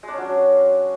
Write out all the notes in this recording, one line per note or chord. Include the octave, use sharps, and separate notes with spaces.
F#3 G#3 C#4 D4